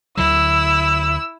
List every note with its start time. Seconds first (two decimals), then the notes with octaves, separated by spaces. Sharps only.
0.17 D2 D3 F#3 E4 E6